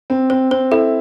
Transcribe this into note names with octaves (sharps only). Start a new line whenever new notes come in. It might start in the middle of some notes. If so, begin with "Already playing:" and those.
C4
C4 C5
C4 C5
E4 A4